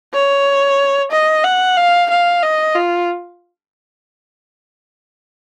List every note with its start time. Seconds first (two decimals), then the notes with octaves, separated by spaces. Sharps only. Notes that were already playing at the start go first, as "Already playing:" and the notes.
0.13 C#5
1.11 D#5
1.44 F#5
1.77 F5
2.10 F5
2.43 D#5
2.75 F4